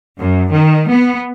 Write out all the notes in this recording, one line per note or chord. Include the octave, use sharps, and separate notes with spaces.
F#2
D#3
B3